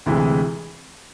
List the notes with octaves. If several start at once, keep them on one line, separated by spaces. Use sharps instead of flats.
D2 C3 E3 G#3